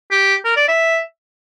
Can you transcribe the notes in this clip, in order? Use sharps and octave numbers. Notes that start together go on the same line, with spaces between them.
G4
A#4
D5
E5